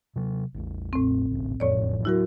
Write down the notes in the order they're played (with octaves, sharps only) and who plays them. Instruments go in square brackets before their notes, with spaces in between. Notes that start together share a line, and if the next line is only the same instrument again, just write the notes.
[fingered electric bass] C3 F#3
A1 E2
[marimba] A2 C4
[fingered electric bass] G#1 C#2
[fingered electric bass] E1 A1 F2 [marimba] A2 C#5 D5
[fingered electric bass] F#3 D4 [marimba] E4 F#4 A#4